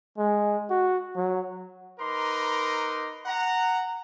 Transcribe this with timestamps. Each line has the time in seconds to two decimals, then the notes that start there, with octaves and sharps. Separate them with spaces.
0.18 G#3
0.70 F#4
1.16 F#3
1.99 D#4 A#4 B4 C6 D6
3.26 F#5 A#5